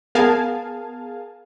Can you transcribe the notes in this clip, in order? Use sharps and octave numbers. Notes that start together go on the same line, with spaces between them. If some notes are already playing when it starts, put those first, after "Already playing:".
B3 G#4 A#4 F5 G#5 A5